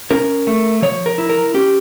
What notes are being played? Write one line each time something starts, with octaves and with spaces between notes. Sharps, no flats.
C#4 A#4
A3
F3 C#5
A#4
E4
A#4
C#4 G4